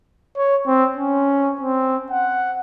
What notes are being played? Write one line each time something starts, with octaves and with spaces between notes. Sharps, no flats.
C#5
C4
C#4
C4
F#5